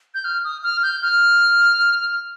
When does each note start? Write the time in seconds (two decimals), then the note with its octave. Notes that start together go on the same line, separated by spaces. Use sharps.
0.14 G6
0.24 F6
0.44 D#6
0.63 F6
0.83 G6
1.02 F6